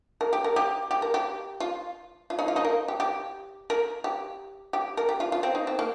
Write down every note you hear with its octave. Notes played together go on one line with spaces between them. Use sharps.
A#4
G4
A#4
G4
G4
A#4
G4
F4
F4
D#4
F4
D#4
A#4
G4
G4
A#4
G4
G4
A#4
G4
F4
F4
C4
D#4
C4
A#3